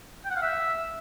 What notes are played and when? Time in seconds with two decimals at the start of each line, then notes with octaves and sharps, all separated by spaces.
0.25 G5
0.30 F#5
0.36 F5
0.42 E5